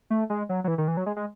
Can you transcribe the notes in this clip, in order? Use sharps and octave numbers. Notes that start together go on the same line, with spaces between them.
A3
G#3
F#3
F#3
E3
D#3
E3
F#3
G#3
G#3